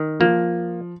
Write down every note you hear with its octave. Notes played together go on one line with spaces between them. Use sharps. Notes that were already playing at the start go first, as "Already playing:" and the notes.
Already playing: D#3
F3 A#3